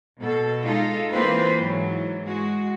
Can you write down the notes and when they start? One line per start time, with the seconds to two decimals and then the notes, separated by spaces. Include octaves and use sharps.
0.20 B2 A4
0.63 G#3 D#4 F4 A4
1.12 E3 A#3 C4 F4 B4 C5
1.56 G#2 E3 F#3
2.24 G#3 F#4